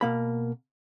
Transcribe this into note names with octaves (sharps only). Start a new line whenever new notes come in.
B2 A#3 B5